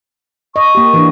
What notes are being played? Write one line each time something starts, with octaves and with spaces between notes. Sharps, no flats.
D#5 C#6
A#3 G4
E3 D4